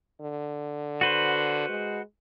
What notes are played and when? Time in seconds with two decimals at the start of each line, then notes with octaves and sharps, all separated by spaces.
0.21 D3
1.01 F#4 B4 C5
1.69 G#3